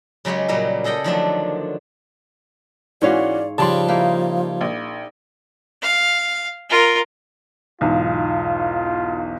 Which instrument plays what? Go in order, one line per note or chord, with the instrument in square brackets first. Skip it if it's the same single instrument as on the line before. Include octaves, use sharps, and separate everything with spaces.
[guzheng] C#3 F#3 G#3 G4 C#5
A#2 C#3 F#3 G3 A#4
G#4 A4 D#5 F#5 G5
D3 D#3 F3 F#3 A3 D4
[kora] G#2 C#5 F5 [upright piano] E3 C#4 F#4 [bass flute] D5
[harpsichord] C#3 G3 [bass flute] F3 [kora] D4 D5 [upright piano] A5 C6
[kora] A#3 D#4 E4
[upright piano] A#1
[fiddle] F5
F4 A#4
[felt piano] B1 E2 G#2 [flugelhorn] F4